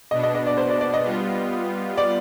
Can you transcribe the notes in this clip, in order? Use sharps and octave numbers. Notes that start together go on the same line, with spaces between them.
B2 B3 D4 D#5
D#5
D#5
D5
C5
D5
D5
D#5
G3 B3 F4
D5